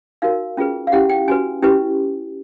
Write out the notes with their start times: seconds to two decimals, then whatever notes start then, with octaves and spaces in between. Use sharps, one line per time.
0.22 D#4 F#4 A#4 F5
0.57 C#4 F4 G#4 B4
0.87 F5
0.92 C#4 E4 G4 F#5
1.09 G5
1.28 C#4 F#4 B4 G#5
1.62 C#4 E4 G4 B4